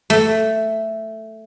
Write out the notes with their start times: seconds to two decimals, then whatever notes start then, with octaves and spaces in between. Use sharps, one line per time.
0.10 A3